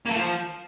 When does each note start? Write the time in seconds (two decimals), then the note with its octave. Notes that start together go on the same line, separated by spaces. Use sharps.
0.06 A#3
0.11 A3
0.16 F3